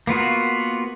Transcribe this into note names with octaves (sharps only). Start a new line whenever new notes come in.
A#3 B3 F4 F#4